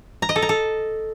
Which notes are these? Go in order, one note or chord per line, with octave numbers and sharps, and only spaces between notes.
A#5
D#5
A4
A#5
A4